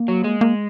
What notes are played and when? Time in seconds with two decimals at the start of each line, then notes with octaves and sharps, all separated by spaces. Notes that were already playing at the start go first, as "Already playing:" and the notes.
Already playing: A#3
0.08 F#3
0.24 G#3
0.41 A#3